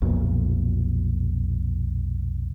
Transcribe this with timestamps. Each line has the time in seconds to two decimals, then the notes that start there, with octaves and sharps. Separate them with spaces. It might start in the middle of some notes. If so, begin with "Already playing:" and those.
0.02 B1 F2 A#2